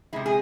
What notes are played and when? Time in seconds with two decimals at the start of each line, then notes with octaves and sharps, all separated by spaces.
0.13 C3 G#3 E4
0.26 G#4